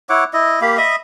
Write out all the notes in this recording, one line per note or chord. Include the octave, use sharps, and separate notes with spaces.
E4 C#5 F#5 D6
E4 D#5
A#3 G4 F5 B5
D#5 E5 B5 D#6